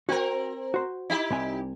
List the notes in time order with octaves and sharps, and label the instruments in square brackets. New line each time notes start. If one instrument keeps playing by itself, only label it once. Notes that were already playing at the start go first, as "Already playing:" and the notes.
[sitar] C4 A#4 [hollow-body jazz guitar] F#4 G5
[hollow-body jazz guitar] F#4 C5
[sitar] D#4 E4 G4
[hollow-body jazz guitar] C2 C3 G#5